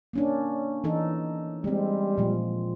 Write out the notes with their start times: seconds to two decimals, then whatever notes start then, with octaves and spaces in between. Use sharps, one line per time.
0.13 A#3 C#4 D4
0.84 E3 D#4 A4
1.64 G3 G#3 C4
2.18 A#2 F3